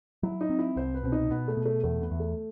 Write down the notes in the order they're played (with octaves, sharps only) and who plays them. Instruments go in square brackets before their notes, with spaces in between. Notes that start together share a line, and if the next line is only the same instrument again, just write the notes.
[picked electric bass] F#3 [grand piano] E4
[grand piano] D#4
[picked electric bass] C4
[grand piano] E4
[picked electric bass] C2 [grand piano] C5
[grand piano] B4
[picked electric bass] B2 [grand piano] C4
[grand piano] D#4
[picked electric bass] B2 [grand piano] B3
[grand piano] A3
[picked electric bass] B2
[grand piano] A3
[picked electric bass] E2 [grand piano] A3
[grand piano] B3
[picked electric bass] E2
[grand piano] A3